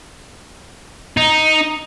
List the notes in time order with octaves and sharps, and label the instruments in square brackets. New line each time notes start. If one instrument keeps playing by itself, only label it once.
[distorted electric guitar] D#4